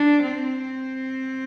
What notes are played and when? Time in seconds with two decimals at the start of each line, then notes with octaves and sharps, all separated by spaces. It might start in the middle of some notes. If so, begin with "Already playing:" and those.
Already playing: D4
0.23 C4